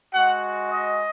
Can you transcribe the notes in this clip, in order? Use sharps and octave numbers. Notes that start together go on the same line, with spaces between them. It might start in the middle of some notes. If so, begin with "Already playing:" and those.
G#3 F#4 F#5
D#5